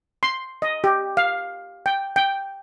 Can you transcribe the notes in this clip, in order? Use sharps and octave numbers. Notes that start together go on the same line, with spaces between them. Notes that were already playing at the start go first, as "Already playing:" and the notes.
C6
D#5
G4
F5
G5
G5